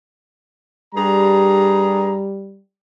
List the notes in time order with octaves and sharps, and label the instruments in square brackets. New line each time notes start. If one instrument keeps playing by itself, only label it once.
[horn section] G2 G#4 A#5 [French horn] G3